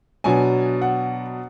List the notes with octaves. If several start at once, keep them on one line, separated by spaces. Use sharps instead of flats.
B2 F#3 B3 D4 G#5
F#5